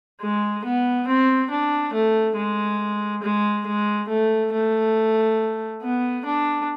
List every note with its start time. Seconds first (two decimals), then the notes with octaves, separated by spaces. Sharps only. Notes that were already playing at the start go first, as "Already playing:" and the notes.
0.21 G#3
0.64 B3
1.07 C4
1.50 D4
1.93 A3
2.37 G#3
3.23 G#3
3.67 G#3
4.09 A3
4.53 A3
5.82 B3
6.25 D4